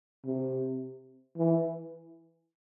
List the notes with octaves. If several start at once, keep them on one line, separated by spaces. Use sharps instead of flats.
C3
E3